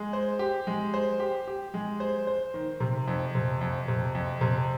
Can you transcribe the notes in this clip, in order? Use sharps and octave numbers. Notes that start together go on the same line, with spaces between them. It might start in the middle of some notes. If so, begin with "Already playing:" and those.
Already playing: G#3
C5
G4
G#3
C5
G4
G4
G#3
C5
C5
D#3
C3
F2
C3
F2
C3
F2
C3